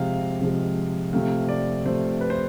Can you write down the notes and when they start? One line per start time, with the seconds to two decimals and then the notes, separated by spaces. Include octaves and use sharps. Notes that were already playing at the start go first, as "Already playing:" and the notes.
Already playing: C3 F3 G#3 F5
0.41 C3 F3 G#3
1.13 C3 F3 A3 F5
1.49 D5
1.85 C3 F3 A3 C5
2.21 B4
2.30 C5